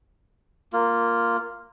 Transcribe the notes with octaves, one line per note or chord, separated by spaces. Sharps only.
A#3 F4